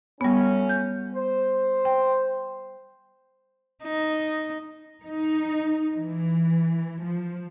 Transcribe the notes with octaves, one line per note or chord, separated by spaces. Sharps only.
F#3 G3 A3 B3 C#4
G6
C5
G5
D#4
D#4
E3
F3